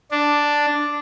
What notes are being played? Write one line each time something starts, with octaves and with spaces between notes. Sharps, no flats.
D4